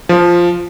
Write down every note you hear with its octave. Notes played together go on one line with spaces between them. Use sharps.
F3